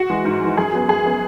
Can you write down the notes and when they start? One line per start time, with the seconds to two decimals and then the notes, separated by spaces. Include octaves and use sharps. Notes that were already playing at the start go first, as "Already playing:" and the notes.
Already playing: F#4
0.10 E3 G#3
0.25 G#2
0.41 E3 G#3
0.57 F#2 G#4
0.73 F#3 B3
0.88 F#2 G#4
1.04 F#3 B3